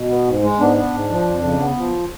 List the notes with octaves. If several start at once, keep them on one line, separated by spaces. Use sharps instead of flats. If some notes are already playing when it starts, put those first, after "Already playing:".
Already playing: B2
B3
G#2
G#3
G#2 B3 D4
B3
G#2
F3
F2
C#3
B3
F3